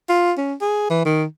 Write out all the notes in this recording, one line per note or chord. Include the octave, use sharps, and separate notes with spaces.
F4
C#4
G#4
E3
D#3